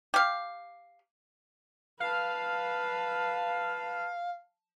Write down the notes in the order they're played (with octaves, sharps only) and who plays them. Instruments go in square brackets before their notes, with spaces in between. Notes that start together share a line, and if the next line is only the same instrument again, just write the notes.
[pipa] G4 F5
[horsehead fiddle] B4 A5 [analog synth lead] F5